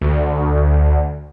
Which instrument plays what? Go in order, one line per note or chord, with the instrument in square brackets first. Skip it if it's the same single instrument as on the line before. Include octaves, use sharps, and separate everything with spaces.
[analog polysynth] D2